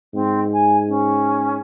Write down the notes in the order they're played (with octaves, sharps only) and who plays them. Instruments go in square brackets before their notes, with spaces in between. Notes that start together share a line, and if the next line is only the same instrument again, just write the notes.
[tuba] G#2 [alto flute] C4
[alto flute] G#5
C#4